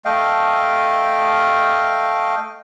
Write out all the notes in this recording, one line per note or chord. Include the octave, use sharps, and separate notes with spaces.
A3 D#5 F5 G5